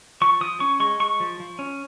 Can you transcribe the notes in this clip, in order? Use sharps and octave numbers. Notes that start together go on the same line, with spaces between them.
F3 C#6
F3 D#6
C#4 C#6
G#3 C#6
G#3 C#6
F3
F3
C#4